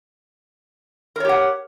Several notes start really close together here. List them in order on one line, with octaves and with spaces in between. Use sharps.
A#4 C#5 G4 F#5